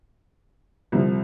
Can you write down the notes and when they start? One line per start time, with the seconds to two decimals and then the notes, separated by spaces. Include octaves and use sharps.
0.92 C2 C3 F3